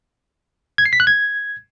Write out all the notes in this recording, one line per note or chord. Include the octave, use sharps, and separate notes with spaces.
G#6
C7
B6
F#6
G#6